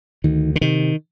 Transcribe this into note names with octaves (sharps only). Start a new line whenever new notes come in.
D2 D#3
D3
C3 D#3